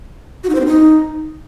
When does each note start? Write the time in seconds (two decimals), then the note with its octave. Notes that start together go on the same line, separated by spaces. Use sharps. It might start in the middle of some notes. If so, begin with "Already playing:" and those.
0.44 F#4
0.49 D#4
0.55 C5
0.60 C4
0.66 D#4